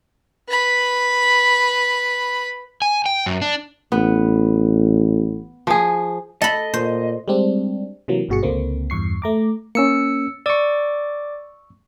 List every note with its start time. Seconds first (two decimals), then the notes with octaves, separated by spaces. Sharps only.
0.49 B4 B5
2.82 G#5
3.06 G5
3.26 F#2
3.42 D4
3.92 A1 B3
5.67 F3 G#4
6.42 A4 D#5 B5
6.74 A#2 C5
7.28 G3 G#3 C4 D4
8.08 C3 E3 F#3 A#3
8.29 G1 G2 B2 F#4 G#4 C#7
8.43 C#2 D3 A#3 C4
8.90 E2 G2 C#6 C7
9.22 A3 A#5 D6
9.75 A#3 C#4 E6 C#7
10.46 D5 C#6 D6 E6